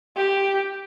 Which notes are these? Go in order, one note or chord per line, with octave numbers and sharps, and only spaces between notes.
G4